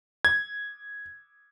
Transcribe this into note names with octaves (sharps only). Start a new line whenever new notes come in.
G#6